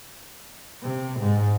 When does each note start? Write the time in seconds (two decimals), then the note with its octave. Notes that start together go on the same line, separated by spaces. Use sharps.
0.83 C3
1.20 G#2